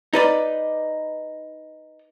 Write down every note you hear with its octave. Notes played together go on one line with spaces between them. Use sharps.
D#4 B4 D5